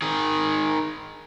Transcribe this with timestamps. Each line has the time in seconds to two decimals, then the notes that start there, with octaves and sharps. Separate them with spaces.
0.02 D#3 G#4